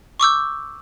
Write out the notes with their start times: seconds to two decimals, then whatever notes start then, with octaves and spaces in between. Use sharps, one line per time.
0.20 C#6 D6 E6 G6